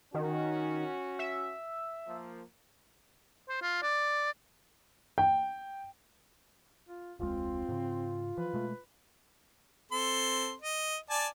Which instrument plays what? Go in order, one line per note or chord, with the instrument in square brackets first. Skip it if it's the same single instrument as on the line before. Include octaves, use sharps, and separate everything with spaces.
[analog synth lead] D#3 [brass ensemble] C#4 F#4
[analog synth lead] E5
[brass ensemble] F3 A#3
[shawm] C5
F4
D5
[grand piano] G5
[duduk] F4
[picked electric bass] E1 C#2 G#3 [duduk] C4 [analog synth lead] F4
[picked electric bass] G#2 C#3
[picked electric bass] E3 F3 [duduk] B4
[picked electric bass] B2 G#3 A3
[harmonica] C4 A4 C6
D#5
D5 G#5 A5